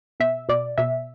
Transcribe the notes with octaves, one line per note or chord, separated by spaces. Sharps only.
B2 E5
B2 D5
B2 E5